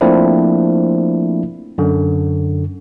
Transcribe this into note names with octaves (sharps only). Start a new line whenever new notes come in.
F3 A3 A#3 C4 D4 E4
F#2 D3